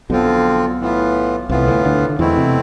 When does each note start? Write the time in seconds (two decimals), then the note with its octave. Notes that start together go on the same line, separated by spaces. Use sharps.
0.10 B1 B2 D3 F3 C4 F4
0.80 A2 E3 B3 F4
1.49 C2 A2 C3 E3 B3 F4
1.67 D2 D3
1.85 D2 D3
2.09 D3
2.19 E2 B2 E3 A3 C4 E4
2.37 C3